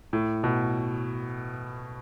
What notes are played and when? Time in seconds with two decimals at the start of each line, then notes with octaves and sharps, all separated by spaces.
0.13 A2
0.44 B2